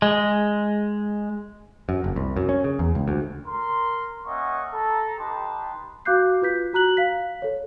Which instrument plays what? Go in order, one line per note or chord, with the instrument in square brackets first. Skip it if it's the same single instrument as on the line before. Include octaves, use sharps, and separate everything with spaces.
[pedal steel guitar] G#3
[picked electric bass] F#2
F#1
C2
F#2
C#4
C#3
E2
C#2
D2
[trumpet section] A#4 C6
A#3 C#4 D#5 E5 F#5 C#6
A4 A#5
D#4 G4 B4 A5 C6
[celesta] F#4 F5 D6 F#6 G6 C7
F4 B4 G6 B6
F#4 A#5 F#6 F#7
F5 B6
A4 C#5